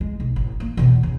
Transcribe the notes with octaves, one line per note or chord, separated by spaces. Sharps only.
G#3
B1
A1
A#3
E2 B2
C#3